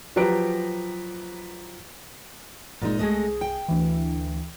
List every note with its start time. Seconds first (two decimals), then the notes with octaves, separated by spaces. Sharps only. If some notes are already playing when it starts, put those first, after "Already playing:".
0.16 F3 F#3 G4 B4 A#5 D7
2.81 G1 A#2 G#3 D#4
2.99 C2 G#3 A3 G#4 D#5
3.41 G5
3.68 D2 E3